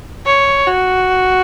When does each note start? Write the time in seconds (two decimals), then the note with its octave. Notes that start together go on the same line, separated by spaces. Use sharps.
0.26 C#5
0.67 F#4